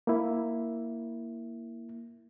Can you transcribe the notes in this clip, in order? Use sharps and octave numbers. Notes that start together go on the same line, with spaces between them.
A#3 E4